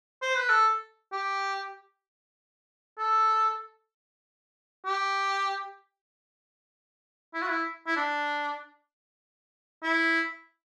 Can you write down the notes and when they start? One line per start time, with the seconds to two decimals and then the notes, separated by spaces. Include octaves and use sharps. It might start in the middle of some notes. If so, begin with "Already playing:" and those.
0.22 C5
0.36 B4
0.49 A4
1.12 G4
2.98 A4
4.85 G4
7.34 E4
7.42 F#4
7.49 E4
7.87 E4
7.96 D4
9.83 E4